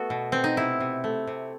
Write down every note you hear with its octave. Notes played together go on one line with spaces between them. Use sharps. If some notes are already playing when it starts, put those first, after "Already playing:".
Already playing: A3 B3 F#4 A4
B2
B2 C4
D#4
C3 E4
C3
A3
C3